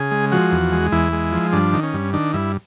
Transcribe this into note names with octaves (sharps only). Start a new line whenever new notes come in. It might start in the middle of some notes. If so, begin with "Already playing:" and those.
Already playing: C#3 G#4
G#3
F3 F#4
E2
G#3
E2 E4
G#3
F3
G2 D4
D#3
C#4
G2
D#3 D4
G2 E4